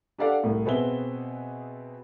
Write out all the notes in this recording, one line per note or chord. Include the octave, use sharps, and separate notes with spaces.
D4 G4 A4 D5 F5 F#5
C2 A2
B2 B3 C4 G#4 E5 G7